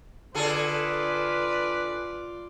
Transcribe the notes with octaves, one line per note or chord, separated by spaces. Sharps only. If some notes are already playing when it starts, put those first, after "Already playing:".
D3 F4 G#4 A4 B4 D5